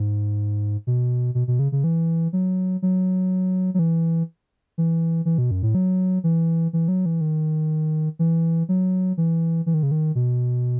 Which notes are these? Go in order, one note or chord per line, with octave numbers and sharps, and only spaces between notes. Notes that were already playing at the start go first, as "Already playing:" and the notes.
Already playing: G#2
B2
B2
B2
C#3
C#3
E3
F#3
F#3
F#3
E3
E3
E3
B2
F#2
A2
F#3
E3
E3
F#3
E3
D#3
E3
F#3
E3
E3
D#3
C#3
D#3
B2